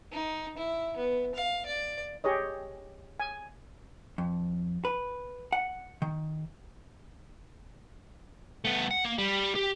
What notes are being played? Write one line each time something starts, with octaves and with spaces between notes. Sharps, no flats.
D#4
E4
B3
F5
D5
G4 G#4 C#5 D#5
G#5
F2
B4
F#5
D#3
A3 B3
F#5
A#3
G3
G4